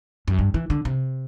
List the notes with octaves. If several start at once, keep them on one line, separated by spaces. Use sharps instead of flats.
F#2
G2
E3
D3
C3